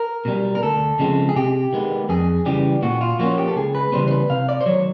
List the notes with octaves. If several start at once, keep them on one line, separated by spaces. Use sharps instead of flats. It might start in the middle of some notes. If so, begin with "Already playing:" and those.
Already playing: A#4
B2 G3
A#4
D2 A4
C#3 F3 G#3 C4
G#4
C3 G4
D#3 G#3 B3
F2 G#4
C#3 E3 G3 G4
A#2 F#4
F4
F3 A#3 C#4 F#4
G4
A4
C#2 G#4
B4
C#3 E3 G3 B3 C5
C5
B4
C3 F5
D5
C5
D#3 F#3 C#5